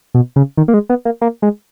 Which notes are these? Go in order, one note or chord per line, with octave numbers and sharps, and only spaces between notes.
B2
C#3
D#3
A#3
G#3
B3
A#3
A#3
G#3